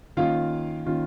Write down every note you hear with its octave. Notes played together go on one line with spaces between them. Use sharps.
D#3 A#3 C#4 F4 F5
D#3 A#3 C#4 F4